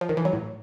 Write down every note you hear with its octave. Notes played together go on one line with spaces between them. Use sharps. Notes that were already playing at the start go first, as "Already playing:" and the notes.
F3
D#3
E3
F#3
A2